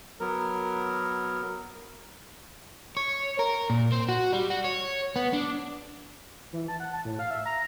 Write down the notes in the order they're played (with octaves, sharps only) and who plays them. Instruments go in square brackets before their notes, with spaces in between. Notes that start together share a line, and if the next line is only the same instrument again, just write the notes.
[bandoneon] F#3 B3 A#4
[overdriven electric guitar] C#5
A#4
A#2
C4
F#4
G3
F#4
C#5
B3
D4
[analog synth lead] E3
A5
F#5
A5
A2
F5
E5
A#5